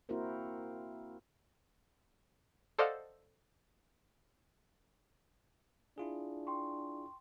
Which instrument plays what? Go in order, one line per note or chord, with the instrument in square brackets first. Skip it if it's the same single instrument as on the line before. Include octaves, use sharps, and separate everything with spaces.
[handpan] A#3 C4 E4 F#4 A#4 C5
[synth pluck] A4 C5 D5 D#5 F5 F#5
[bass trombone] D4 [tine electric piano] E4 F4 G#4
[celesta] G5 C6 C#6